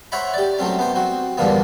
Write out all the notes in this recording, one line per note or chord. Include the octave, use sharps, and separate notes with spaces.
C5 C#5 E5 F#5 A#5 B5
G4 D5
F#3 A3 C4 C#4
B3 C5
C4 F#4
E2 G2 D3 F3 A#3 B3